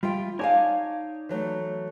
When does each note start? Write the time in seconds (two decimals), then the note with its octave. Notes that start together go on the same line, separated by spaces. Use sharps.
0.03 G3 F4 E5 G5
0.39 D#4 C#5 D5 F5 G#5 A5
1.29 E3 F#3 A3